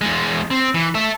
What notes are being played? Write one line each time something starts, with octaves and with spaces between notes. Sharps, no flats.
E2 G#3
C4
E3
A4 E5